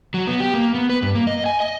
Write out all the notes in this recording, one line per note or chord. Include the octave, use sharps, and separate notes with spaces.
F#3
B3
G4
A#3
B3
B4
G2
A#3
D#5
G#5
D#5